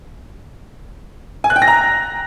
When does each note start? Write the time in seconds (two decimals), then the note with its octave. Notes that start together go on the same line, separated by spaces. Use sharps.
1.44 G#5
1.50 F#6
1.56 G5
1.62 A#6
1.68 A#5